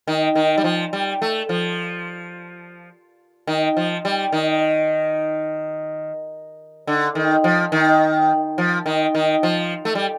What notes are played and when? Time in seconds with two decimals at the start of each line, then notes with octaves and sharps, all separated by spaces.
0.08 D#3
0.36 D#3
0.58 G3
0.64 F3
0.93 G3
1.22 A3
1.49 F3
3.47 D#3
3.77 F3
4.05 G3
4.32 D#3
6.87 D3
7.15 D#3
7.44 F3
7.72 D#3
8.58 F3
8.86 D#3
9.15 D#3
9.43 F3
9.85 A3
9.95 G3